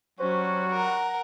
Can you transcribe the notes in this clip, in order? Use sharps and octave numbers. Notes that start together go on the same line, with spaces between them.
F#3 G3 C#4 F#4 C5
A#4 F#5 A#5